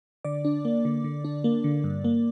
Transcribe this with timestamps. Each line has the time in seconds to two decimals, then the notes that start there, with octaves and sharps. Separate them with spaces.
0.25 D3 D5 D6
0.45 D4
0.65 A#3
0.85 D3
1.04 D3
1.25 D4
1.44 A#3
1.64 D3
1.84 G2
2.04 A#3